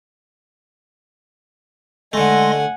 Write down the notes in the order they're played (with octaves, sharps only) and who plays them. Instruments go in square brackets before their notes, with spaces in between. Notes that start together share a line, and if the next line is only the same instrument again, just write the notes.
[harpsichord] D3 A3 [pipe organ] G#3 C6 A#6 [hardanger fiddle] F#5 G#5